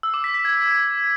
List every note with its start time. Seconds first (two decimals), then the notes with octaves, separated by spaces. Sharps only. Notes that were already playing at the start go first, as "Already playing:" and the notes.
0.03 E6
0.14 D6
0.24 B6
0.34 B6
0.45 G#6